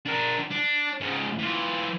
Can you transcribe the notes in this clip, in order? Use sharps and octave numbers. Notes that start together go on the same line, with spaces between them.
D4 A#4
D4
G#2 C#3
E3 F4